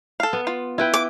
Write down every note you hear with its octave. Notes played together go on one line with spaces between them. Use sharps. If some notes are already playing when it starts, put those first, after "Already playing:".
A4 F5
B3
F4
E4 B4 G5
D6